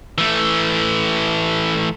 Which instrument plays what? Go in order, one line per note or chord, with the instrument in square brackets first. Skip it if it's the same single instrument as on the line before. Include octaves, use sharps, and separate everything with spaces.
[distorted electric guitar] E3 A3